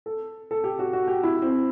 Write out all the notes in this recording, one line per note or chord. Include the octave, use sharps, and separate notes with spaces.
A4
A4
G4
F#4
F#4
G4
E4
C4